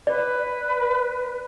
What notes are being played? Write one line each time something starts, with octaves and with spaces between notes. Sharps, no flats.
B4 D5